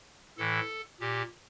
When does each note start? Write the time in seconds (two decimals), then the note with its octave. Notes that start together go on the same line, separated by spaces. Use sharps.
0.38 A2 E3 A4
1.00 A#2 G4